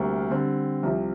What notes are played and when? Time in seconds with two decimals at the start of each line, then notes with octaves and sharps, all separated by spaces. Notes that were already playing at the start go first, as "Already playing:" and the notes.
Already playing: D2 C3 G3 A#3
0.30 D3 G3 C4
0.83 C2 C3 F3